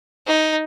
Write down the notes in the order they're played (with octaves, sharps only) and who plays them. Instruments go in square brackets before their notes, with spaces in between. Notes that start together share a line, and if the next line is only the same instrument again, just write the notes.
[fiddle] D#4